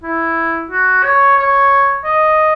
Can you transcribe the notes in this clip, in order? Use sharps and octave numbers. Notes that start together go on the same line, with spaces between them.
E4
F#4
C#5
C#5
D#5